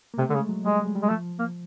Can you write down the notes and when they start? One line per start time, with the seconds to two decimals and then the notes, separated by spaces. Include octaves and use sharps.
0.14 A#3
0.18 C3 A3
0.29 D3 A3
0.34 C#3 G#3
0.49 F#3
0.65 G3 G#3
0.80 G#3
0.95 G3
1.03 G#3
1.09 F3 A3
1.39 A#3